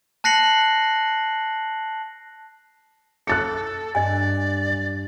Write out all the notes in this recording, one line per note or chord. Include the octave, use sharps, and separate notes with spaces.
A5 F#6 A#6 C7 C#7 F#7
A4 F#6 A6 C#7
G2 D5 D#5 G#5